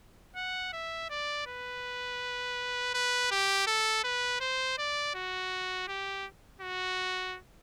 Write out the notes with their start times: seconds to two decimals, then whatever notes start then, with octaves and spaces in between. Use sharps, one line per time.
0.36 F#5
0.73 E5
1.10 D5
1.47 B4
2.94 B4
3.31 G4
3.67 A4
4.04 B4
4.40 C5
4.78 D5
5.15 F#4
5.88 G4
6.61 F#4